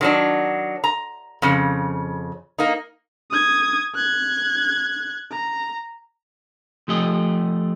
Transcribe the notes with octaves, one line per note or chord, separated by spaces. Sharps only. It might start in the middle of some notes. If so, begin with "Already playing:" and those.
D#3 F#3 D4
A#5
F2 C#3
A#3 D#4
D#6 G#6
F#6 G#6
A#5
F3 A3 G4 G#4 D#5